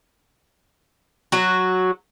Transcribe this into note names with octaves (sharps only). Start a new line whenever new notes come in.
F#3 F#4